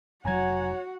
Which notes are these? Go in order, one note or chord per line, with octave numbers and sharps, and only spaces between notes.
F1 F#3 F#4 C#5 F#5 G#5 A#5 G#6